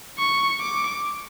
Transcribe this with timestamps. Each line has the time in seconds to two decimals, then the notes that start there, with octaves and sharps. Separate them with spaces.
0.19 C#6
0.60 D6